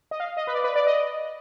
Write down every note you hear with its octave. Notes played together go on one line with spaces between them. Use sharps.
D#5
F5
D#5
B4
D5
B4
D5
D#5